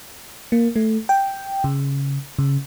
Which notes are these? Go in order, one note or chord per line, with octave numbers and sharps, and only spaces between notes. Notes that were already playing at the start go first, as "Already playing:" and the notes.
A#3
A3
G5
C#3
C#3